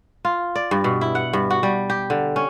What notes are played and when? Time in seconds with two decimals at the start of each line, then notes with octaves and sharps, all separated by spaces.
0.25 F4
0.55 D5
0.71 G2
0.84 B2
1.01 E4
1.15 F#5
1.33 G2
1.50 F#4
1.63 G3
1.90 G4
2.10 D3
2.36 C#4